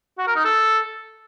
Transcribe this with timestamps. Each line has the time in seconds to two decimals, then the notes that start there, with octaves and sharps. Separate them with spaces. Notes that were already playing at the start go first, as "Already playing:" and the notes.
0.18 F#4
0.27 A#4
0.36 D#4
0.45 A4